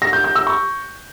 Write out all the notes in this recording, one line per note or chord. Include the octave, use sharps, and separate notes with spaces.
A#6
G6
G6
E6
C#6